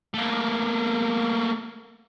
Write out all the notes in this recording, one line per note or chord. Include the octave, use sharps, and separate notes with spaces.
A3 A#3